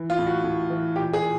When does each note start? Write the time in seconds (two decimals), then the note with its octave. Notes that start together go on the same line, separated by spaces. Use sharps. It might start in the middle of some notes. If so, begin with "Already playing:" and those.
Already playing: E3
0.10 F4
0.19 A2
0.27 F#4
0.44 A2
0.70 E3
0.96 A#2 G4
1.13 G#4
1.22 A#2